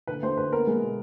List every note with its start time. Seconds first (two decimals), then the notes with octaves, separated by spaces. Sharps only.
0.07 D3 B4
0.23 D2 C5
0.37 D2 B4
0.52 B3 A#4
0.67 G#3
0.82 B2